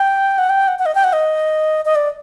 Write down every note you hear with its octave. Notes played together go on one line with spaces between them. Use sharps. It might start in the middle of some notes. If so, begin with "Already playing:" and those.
Already playing: G5
F#5
G5
F#5
F#5
D#5
G5
F#5
D#5
D#5
D5